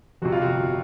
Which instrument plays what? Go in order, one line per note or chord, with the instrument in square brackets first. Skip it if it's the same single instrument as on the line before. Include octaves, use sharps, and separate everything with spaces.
[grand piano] G1 F2 C3 [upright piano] F#4
[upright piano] F4
F#4